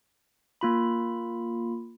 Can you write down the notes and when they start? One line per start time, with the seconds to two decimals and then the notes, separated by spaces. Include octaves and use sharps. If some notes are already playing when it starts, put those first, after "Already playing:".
0.61 A#3 F4 B5